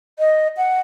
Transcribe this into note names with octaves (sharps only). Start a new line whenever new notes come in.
D#5
F#5